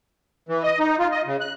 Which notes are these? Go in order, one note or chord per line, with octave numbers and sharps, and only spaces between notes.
E3
D#5
D#4
F4
D#5
C#3
F#6